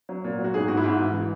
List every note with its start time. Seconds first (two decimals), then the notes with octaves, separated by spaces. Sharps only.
0.09 F#3
0.24 A#2
0.39 F#3
0.44 F#4
0.54 G#2 G#4
0.68 G#2 F#4
0.77 E4
0.84 G#2
0.99 E3
1.14 E3